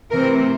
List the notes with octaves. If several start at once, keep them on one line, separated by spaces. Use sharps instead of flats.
C3 E3 A3 C4 A#4